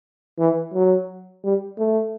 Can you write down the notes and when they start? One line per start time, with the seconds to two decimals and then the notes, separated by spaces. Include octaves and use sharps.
0.39 E3
0.74 F#3
1.44 G3
1.79 A3